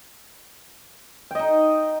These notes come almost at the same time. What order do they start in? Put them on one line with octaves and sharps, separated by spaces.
G5 D#5 D#4